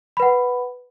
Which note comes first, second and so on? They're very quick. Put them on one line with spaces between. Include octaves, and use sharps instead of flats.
B5 B4 F#5